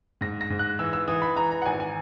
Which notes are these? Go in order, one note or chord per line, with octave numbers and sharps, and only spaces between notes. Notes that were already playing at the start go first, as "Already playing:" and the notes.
G#2 A#6
A#6
G#2
F#6
E3 E6
E6
E3 D#6
B5
E3 A#5
A#5
F#5
G#1 G#5
G#5